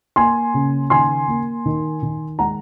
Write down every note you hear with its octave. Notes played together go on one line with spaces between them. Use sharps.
A#3 G#5 C6
C#3
D#3 G#5 C6
A#3
D#3
D#3
G#3 F#5 A#5